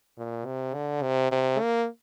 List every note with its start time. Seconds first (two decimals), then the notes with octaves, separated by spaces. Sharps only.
0.18 A#2
0.45 C3
0.74 D3
1.02 C3
1.31 C3
1.60 A#3